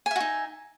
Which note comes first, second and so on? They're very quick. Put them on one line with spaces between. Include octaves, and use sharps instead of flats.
G#5 E5 F#4 D#4